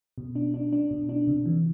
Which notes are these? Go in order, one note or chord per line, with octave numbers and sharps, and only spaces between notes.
B2
D4
D4
D4
B2
D4
C3
E3